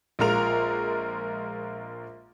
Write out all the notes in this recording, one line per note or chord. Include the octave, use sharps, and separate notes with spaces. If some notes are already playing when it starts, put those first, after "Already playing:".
A#1 G#3 F4 A#4 F7